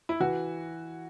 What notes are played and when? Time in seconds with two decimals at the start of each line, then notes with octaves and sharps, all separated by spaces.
0.09 E4
0.20 E3 F#4